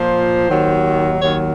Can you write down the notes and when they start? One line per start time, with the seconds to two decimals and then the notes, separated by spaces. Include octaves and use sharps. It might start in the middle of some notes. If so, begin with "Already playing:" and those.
Already playing: A#2 F3 C5
0.49 D#2 D#3 F#3
1.20 D#2 D#3 F#3 C#5